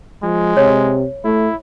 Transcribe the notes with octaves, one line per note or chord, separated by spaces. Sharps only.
F3 G#3
C3 C#5
A3 E4